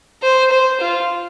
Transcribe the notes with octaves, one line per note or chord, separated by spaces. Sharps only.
C5
C5
F4